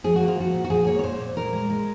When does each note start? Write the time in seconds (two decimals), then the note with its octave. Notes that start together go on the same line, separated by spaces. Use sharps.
0.04 F3 G#4
0.16 A#3 F#4
0.28 F4
0.37 F3 F#4
0.54 A#2
0.64 F#4
0.70 F3 G#4
0.87 A#3 C#5
0.99 C#5
1.03 A#2 C5
1.20 A#2
1.36 A#2 A#4
1.53 G#3
1.70 G#3